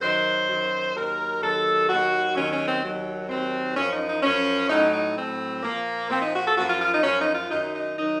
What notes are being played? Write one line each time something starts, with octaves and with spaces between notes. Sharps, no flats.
F#2 D#3 F#3 C5
F#2 D#3 F#3
D#2 D#3 F#3 A#4
D#2 D#3 F#3 A4
D#2 D#3 F#3 F#4
D#2 D#3 F#3 C#4
C#4
C4
D#2 D#3 F#3
D#2 D#3 F#3 C4
F#2 F3 C#4
D#4
D#4
F#2 F3 C#4
A2 F#3 D#4
D#4
A2 F#3 C4
A#2 F3 A#3
A#2 F3 C4
D#4
F#4
A4
F#2 F3 F#4
F4
F4
D#4
F#2 F3 C#4
D#4
F4
F#2 D#3 F#3 D#4
D#4
D#3 F#3 D#4